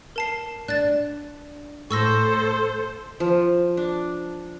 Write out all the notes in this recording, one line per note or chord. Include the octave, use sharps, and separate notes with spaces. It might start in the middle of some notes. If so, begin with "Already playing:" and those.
A#4 A5 C7
D4 F#6 A6
A2 A4 C5 C#6 E6 A#6
F3
D4